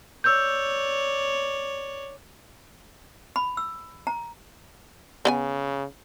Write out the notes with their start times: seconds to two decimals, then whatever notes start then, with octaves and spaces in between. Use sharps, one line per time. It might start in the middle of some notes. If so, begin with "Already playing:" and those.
0.24 C#5 D5 E6 G6
3.36 B5
3.57 E6
4.07 A#5
5.25 C#3 B3 D5 G#5